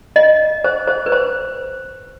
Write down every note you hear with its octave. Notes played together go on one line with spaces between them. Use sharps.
D#5
C5
C5
B4
C5